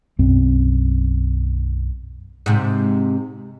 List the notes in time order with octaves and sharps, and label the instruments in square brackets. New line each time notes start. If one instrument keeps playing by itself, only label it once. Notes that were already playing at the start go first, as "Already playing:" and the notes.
[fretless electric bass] B1 F#2 C4
[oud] G#2 C3